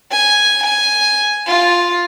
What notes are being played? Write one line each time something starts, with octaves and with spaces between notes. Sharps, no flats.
G#5
G#5
F4